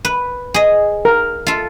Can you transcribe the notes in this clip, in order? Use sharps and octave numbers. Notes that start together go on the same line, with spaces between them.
B4
G#4 D#5
A#4
F4 A4